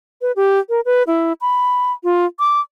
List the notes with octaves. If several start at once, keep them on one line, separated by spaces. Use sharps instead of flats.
B4
G4
A#4
B4
E4
B5
F4
D6